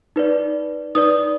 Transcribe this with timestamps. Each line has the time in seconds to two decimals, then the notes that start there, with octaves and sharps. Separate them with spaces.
0.16 D#4 B4 D5
0.95 D#4 B4 D5 D#6